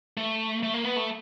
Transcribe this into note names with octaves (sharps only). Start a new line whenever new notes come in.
A3
A3
A#3
B3
A3